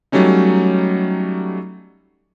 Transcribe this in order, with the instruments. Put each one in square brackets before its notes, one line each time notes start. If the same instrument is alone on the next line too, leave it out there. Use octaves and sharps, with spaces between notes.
[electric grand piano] F#3 G3 A3 C#4 D#4